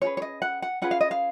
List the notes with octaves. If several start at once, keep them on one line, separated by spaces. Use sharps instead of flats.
C#4 F4 G#4 B4 C#5
C#5
D#5
F#5
F#5
C#4 F4 G#4 B4 F#5
F5
D#5
F5